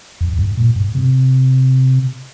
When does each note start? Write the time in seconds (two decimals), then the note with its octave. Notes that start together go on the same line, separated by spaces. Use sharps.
0.21 F2
0.33 F2
0.39 G2
0.58 A#2
0.76 G2
0.95 C3